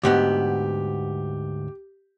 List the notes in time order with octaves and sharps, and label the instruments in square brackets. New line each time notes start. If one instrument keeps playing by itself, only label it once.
[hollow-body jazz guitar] D2 G#2 B3 [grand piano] G4